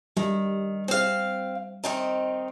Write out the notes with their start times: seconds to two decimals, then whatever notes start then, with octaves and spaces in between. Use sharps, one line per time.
0.17 D#3 G3
0.88 C4 F5
1.84 D#3 C4 D#4